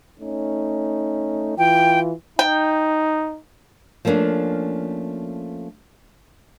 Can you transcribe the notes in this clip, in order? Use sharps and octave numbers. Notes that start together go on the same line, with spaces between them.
A3 C#4 D#4
E3 F4 G5
D#4 G5
F3 A3 A#3 C#4 D4